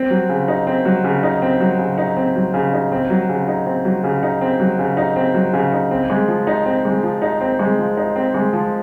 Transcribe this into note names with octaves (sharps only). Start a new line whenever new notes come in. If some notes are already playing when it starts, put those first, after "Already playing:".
Already playing: C4
F#3
C#3
D#4
C4
F#3
C#3
D#4
C4
F#3
C#3
D#4
C4
F#3
C#3
D#4
C4
F#3
C#3
D#4
C4
F#3
C#3
D#4
C4
F#3
C#3
D#4
C4
F#3
C#3
D#4
C4
G#3
F3
D#4
C4
G#3
F3
D#4
C4
G#3
F3
D#4
C4
G#3
F3